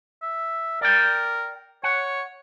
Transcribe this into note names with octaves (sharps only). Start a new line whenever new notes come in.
E5
A#4 D5 G5
C#5 F#5